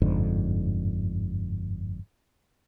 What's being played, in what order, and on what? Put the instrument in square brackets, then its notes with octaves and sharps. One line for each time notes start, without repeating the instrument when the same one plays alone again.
[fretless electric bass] G1 F2 G#2 D3